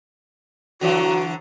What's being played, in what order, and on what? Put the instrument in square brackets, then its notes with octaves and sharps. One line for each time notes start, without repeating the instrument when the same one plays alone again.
[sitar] D3 E3 F#3 [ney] F#4